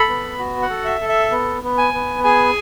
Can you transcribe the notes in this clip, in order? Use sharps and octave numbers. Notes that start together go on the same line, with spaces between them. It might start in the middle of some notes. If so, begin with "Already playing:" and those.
Already playing: A4 B5
B3
F#4
F#5
A4
E5
A4
E5
B3
B3
G#5
B3
G#4 G#5